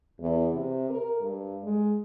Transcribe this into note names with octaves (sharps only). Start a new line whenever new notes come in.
E2
C3
A#4
G2
G#3